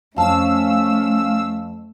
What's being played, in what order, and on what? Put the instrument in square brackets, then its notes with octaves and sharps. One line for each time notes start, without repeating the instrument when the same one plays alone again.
[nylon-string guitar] F2 A5 [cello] A3 [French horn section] C#4 [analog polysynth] F5 E6